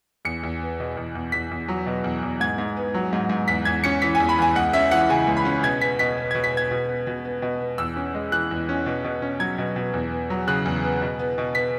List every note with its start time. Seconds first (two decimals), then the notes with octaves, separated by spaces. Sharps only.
0.25 E2 C#7
0.43 E2
0.61 B3
0.80 B2
0.97 E2
1.15 E2
1.32 E2 B6
1.51 E2
1.68 F#3
1.86 B2
2.04 E2
2.23 E2
2.40 G#2 G#6
2.58 G#2
2.77 B3
2.94 F#3
3.13 G#2
3.30 G#2
3.48 E2 B6
3.65 E2 G#6
3.84 C#4 C#7
4.02 E3 B6
4.15 G#5
4.20 E2
4.29 B5
4.38 E2 G#5
4.55 C#2 F#5
4.73 C#4 E5
4.91 E3 F#5
5.09 C#3 G#5
5.27 C#2
5.37 B5
5.45 C#4
5.63 B2 G#6
5.81 B3 B6
5.99 B2 B6
6.18 B3
6.31 B2 G#6
6.44 B6
6.52 B3 G#6
6.71 B2
6.89 B3
7.07 B2
7.25 B3
7.42 B2
7.60 B3
7.78 E2 E6
7.96 C#4
8.15 G#3
8.32 E3 F#6
8.51 E2
8.69 C#4
8.86 B2
9.04 B2
9.22 C#4
9.40 F#3 G#6
9.58 B2
9.76 B2
9.94 E2
10.11 B3
10.30 F#3
10.48 C#3 F#6
10.65 E2
10.83 B3
11.02 B2
11.19 B3
11.38 B2
11.55 B3 B6